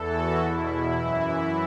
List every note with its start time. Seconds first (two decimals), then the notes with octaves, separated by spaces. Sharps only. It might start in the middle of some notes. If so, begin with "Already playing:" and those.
Already playing: E2 E3 A4
0.10 F#4
0.38 E2 B2 E4
0.68 E4
0.96 F#2 E3 E4